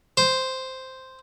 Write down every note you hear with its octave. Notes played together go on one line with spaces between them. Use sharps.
C5